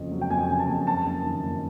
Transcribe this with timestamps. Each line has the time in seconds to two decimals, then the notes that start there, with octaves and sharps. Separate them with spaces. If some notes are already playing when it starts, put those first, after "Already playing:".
Already playing: F2 C#3
0.11 F#3
0.21 G5
0.30 F2 G#5
0.49 C#3 G#5
0.59 A5
0.68 F2
0.87 F#2 A5
1.06 F#1
1.25 D#3
1.44 F#1